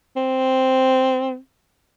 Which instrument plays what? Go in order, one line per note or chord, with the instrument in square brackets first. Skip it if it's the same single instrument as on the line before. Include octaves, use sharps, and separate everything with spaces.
[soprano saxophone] C4